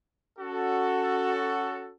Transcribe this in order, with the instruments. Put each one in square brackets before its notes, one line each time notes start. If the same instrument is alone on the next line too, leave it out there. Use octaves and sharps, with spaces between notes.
[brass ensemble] C#4 F#4 A4